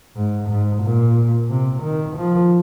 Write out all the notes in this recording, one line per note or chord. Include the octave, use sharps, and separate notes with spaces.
G#2
G#2
A#2
C3
D#3
F3